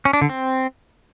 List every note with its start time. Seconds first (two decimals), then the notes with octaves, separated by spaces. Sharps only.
0.05 C#4
0.13 D4
0.21 D3
0.29 C4